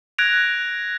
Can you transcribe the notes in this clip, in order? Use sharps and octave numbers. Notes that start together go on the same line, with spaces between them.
F#6 G#6 A#6 D7 F7